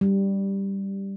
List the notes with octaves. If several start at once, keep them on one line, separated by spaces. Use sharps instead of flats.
G3